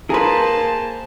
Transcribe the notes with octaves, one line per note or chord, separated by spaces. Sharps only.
A#3 G#4 B4 C5 A5 A#5 C6